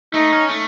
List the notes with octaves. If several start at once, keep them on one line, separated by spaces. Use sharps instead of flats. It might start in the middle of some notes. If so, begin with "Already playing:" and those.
A3 D#4
C#4
A3